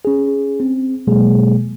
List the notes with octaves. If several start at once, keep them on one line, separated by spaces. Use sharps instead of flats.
C#4 G#4
C4
B2 F#3 G#3 A#3 G#4